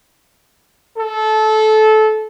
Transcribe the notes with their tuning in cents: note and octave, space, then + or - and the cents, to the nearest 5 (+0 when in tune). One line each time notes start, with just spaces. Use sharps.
A4 -20